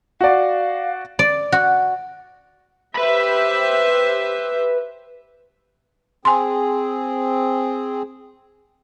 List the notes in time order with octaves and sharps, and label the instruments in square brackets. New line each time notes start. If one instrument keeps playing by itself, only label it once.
[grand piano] F#4 D5 [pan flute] F5
[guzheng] D5
F#4
[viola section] G4 C5 E5 [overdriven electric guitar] B4 B5
[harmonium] C4 G#4 [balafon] G#5 C6